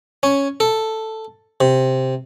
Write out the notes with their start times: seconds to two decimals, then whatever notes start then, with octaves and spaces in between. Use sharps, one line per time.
0.23 C#4
0.60 A4
1.61 C3